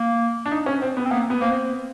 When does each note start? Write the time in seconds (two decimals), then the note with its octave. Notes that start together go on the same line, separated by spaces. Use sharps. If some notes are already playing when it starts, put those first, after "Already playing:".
Already playing: A#3
0.46 D4
0.51 D#4
0.66 C#4
0.82 C4
0.97 B3
1.05 C4
1.11 A#3 B3
1.30 B3
1.41 A#3 C4